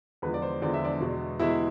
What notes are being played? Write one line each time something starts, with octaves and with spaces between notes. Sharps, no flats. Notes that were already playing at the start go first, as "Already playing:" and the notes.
E2 D3 F3 G#3 B4
D5
C5
E2 D3 F3 G#3 D5
E5
D4 D5
E2 B2 G#3
E2 B2 G#3 E4 E5